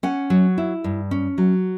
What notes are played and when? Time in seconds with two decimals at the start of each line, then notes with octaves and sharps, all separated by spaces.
0.03 C#4 F#5
0.30 F#3
0.58 E4
0.84 G2
1.11 C#4
1.38 F#3